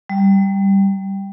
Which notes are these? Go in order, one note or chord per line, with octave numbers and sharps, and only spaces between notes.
G3